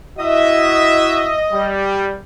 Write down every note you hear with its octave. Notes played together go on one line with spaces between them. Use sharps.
E4 F#4 D#5 E5
G3